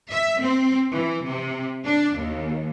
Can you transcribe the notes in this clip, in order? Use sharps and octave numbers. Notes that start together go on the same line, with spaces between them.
E5
C4
E3
C3
D4
D#2